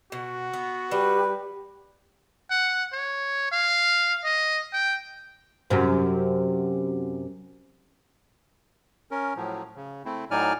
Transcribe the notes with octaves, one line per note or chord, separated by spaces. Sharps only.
B2 F#4
B3
G3 G4 B4
F#5
C#5
F5
D#5
G5
F#2 C3
C#4 A#4
A2 F3 F#3
C#3
A3 C4 E4
A2 F#3 D#4 D5 G#5 F6